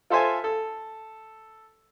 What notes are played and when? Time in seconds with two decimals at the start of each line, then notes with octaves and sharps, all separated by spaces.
0.10 F4 A4 C5 E5 G#5
0.44 A4